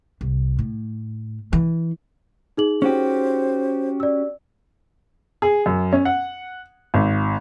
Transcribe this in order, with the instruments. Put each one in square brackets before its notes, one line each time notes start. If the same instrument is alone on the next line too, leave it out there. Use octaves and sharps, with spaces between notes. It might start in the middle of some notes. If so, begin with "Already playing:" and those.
[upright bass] C2
A2
E3
[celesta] D#4 G#4 F#7
[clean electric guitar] C#4 F#4 G4 [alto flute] C5
[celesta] D5 E6
[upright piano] G#4
F#2
C#4
F#5
G#1